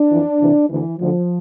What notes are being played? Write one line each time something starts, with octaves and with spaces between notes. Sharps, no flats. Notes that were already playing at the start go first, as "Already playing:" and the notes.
Already playing: D4
F2 E3
D2 C3 E3
D2 D3 E3
D2 D3 F3